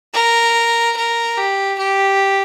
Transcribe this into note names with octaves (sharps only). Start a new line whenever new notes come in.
A#4
A#4
G4
G4